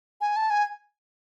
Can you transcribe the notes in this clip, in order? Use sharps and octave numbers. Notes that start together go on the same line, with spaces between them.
G#5
A5
G#5